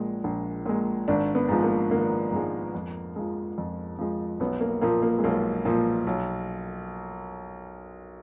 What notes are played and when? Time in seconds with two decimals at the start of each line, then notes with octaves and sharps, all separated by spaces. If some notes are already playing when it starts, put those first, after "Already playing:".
Already playing: A#1 A#2 G#3
0.24 A#1
0.66 A#2 G#3
1.08 G#1 D4
1.35 B3
1.49 G#2 F3 G#3
1.63 A#3
1.90 G#1 A#3
2.32 G#2 F3 G#3
2.74 F2
3.16 F3 G#3
3.58 F2
3.99 F3 G#3
4.40 B1 B3
4.61 A#3
4.81 A#2 F3 A#3
5.02 A#3
5.18 G#3
5.24 B1 A#3
5.65 A#2 F3
6.07 B1